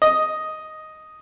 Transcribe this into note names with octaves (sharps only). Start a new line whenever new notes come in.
D#5